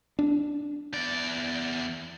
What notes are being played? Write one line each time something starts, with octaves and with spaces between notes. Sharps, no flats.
D4
E2 D5